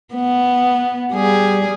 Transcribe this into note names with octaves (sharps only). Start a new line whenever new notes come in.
B3
G3 G#4